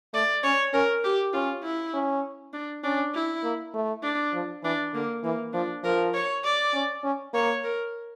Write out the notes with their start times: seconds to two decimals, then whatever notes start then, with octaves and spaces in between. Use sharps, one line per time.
0.13 A3 D5
0.44 C#4 C#5
0.74 C#4 A#4
1.04 G4
1.33 C#4 F4
1.63 E4
1.94 C#4
2.54 D4
2.84 C#4 D4
3.14 E4
3.44 A#3
3.74 A3
4.03 D4
4.33 F3
4.64 E3 D4
4.93 D3 A#3
5.24 E3 A#3
5.53 F3 D4
5.84 F3 A#4
6.14 C#5
6.44 D5
6.74 C#4
7.04 C#4
7.34 A#3 C#5
7.64 A#4